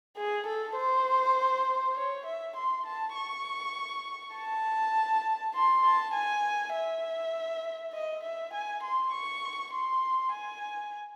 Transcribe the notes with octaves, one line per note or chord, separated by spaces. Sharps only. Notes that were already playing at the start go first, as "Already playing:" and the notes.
G#4
A4
C5
C#5
E5
C6
A5
C#6
A5
C6
A5
G#5
E5
D#5
E5
G#5
C6
C#6
C6
G#5